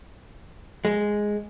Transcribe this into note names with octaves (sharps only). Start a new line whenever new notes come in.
G#3